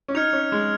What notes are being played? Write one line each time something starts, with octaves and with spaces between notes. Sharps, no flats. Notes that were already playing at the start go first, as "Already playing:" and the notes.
C#4
D#4 F6 G#6 C#7 F7
C#4
G#3